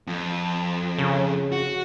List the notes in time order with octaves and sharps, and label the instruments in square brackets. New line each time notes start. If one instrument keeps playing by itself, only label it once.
[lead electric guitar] F2
[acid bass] C#3
[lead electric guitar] F#4